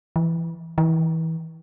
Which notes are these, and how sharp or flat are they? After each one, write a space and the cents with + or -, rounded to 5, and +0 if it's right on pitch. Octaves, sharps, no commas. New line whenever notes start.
E3 +10
E3 -30